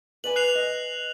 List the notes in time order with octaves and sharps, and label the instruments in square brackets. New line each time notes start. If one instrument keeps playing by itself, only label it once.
[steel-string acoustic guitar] B4 D5 G#5 [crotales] F#7
[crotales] F#6 C7 F7
[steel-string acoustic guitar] D#5